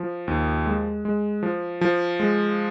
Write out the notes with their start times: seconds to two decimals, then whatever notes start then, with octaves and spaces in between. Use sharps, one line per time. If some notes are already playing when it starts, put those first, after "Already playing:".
Already playing: F3
0.28 D#2
0.66 G#3
1.05 G#3
1.43 F3
1.81 F3
2.20 G#3